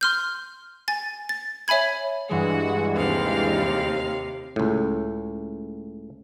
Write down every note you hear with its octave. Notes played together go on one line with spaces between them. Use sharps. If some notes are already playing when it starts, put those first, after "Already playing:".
C6 F6 G6
G#5 A6
A6
C#5 E5 G#5 B5 G#6
G2 E3 G#3 F#4
D#2 C3 F5
C#2 A2